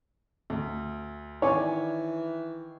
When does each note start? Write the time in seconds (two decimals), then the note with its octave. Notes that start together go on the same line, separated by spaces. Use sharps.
0.50 D2
1.42 D#3 E3 C#5 D5 G#5